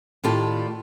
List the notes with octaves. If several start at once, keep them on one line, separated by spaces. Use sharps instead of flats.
A2 D#3 F4 G4 D5 A5